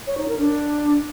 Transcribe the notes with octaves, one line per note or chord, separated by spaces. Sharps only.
C#5
D#4
A#4
D4